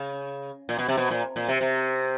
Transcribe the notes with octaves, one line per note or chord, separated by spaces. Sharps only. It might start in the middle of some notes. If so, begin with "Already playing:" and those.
Already playing: C#3
A#2
B2
C3
B2
A#2
A#2
C3
C3